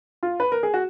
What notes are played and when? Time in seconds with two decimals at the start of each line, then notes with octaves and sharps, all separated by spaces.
0.23 F4
0.40 B4
0.52 A#4
0.63 G#4
0.74 F#4